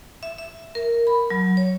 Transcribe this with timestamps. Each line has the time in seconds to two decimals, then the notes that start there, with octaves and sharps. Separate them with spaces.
0.23 E5
0.38 E5
0.75 A#4
1.07 B5
1.30 F#3
1.57 C#5